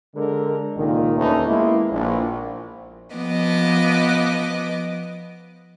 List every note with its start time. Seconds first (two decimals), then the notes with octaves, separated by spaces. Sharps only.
0.15 D3 G#3 A#4
0.77 C#2 A#2 D#3
1.18 D#2 D3 A3 C#4 D#4 B4
1.46 G#3 A#3 B3 E4
1.92 A#1
3.15 F3 B3 D#5 D6